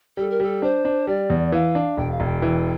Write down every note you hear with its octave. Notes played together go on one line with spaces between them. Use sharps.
G3 A4
A#4
G3 A4
D4 C5
D4
G3 D5
E2
E3 F5
D4
E1 G5
F5
E1 G5
E3